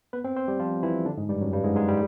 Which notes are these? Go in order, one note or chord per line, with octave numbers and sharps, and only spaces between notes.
B3 B4
C4 C5
C4 C5
G3 G4
F3 F4
E3 E4
D3 D4
G#2 G#3
G2 G3
F#2 F#3
G2 G3
G#2 G#3
G#2 G#3
G3